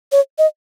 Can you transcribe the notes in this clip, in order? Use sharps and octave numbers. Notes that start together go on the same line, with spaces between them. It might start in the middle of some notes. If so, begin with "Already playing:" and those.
C#5
D#5